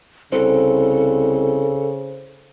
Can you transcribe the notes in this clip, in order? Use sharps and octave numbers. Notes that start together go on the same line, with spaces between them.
C2 C#3 A4 C5